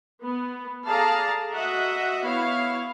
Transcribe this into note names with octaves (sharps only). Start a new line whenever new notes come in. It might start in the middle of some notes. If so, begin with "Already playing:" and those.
B3
G#4 A4 D5 F5 A5 A#5
F#4 D#5 E5 F#5
B3 E4 C#5 F5